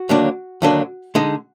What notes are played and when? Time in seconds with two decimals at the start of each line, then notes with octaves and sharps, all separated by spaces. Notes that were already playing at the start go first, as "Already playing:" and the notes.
Already playing: F#4
0.09 D#2 D3 F#3 A#3 D4
0.62 D#2 D3 F#3 A#3 D4
1.15 D3 G#3 D#4